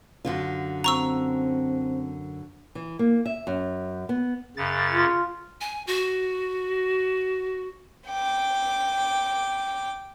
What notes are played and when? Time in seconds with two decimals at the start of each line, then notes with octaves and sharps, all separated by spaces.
0.25 F#2 D3 F4
0.84 C4 A#5 C#6 E6
2.75 E3
2.99 A#3
3.26 E5
3.47 F#2
4.09 B3
4.57 F#2 C#3 A6
4.91 F4
5.61 G#5
5.87 F#4
8.09 G5 D6